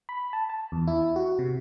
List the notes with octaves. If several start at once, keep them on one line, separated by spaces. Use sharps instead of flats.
B5
A5
A5
E2
E4
F#4
C3